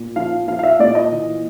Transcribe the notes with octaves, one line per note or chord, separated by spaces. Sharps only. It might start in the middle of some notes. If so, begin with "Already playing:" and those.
Already playing: A#2
F3 F5
F3 F5
F5
E5
A#2 D5
D#5
E3